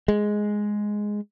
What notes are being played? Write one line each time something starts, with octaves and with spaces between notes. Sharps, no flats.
G#3